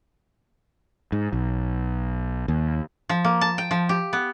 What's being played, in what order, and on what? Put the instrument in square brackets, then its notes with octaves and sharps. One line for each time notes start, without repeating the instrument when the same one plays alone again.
[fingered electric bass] G#2
B1
D#2
[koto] F3
A#3
A5
G5
F3
G4
B3